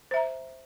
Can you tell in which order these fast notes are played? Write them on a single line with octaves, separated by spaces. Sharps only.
C5 E5 A#5